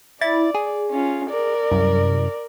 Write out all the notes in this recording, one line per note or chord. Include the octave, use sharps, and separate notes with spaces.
E4 D5 A6
G#4
C#4 F4
A#4 D5
C2 F#2